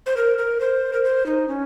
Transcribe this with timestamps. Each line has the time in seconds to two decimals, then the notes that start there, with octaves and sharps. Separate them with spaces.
0.06 C5
0.17 A#4
0.38 A#4
0.60 C5
0.93 A#4
1.04 C5
1.26 D#4
1.48 C#4